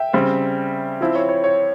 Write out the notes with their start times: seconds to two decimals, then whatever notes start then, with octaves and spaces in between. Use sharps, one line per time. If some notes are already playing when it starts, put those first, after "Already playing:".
Already playing: E5 G5
0.13 C#3 G3 C4
1.01 F3 C4 E4
1.15 C#5
1.29 C#5
1.44 C#5